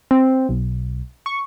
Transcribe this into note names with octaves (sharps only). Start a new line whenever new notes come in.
C4
B1
C#6